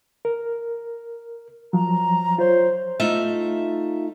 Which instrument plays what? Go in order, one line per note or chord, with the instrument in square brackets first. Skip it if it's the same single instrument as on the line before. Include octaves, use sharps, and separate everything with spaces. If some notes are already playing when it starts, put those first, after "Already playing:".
[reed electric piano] A#4
[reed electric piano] F3 F#3 [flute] A#5
[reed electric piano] F4 C#5 [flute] C5
[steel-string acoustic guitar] A3 D#4 F4 E5